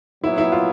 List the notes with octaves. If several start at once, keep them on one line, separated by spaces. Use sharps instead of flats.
A#2 F#3 B3 E4
E4
F4